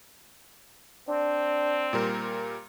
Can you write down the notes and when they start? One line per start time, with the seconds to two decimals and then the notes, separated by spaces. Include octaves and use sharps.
1.08 C4 D4
1.93 A#2 G3 A#4